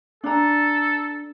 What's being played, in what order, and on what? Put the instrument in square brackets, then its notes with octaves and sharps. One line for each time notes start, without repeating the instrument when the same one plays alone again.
[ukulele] D4 A#5 [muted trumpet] A4